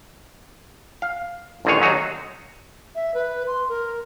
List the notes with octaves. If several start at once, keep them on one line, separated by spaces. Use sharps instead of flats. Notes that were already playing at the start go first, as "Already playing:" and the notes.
F5
A1 D3 D#3 G#4 C#5
D#2 F#3 D#4 F#4
E5
B4
C6
A#4